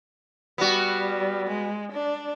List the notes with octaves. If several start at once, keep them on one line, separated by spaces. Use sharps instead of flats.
G3 B3 F#4
G#3
D4